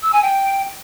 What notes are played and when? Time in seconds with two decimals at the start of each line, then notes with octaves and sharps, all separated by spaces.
0.03 E6
0.12 G#5
0.22 G5